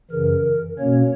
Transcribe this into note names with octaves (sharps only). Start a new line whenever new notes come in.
F#2 C#3 E3 A#4
B2 A#3 C#4 C#5